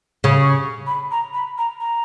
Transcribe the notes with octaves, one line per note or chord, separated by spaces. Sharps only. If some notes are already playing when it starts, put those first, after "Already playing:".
C#3
C#6
B5
A#5
B5
A#5
A#5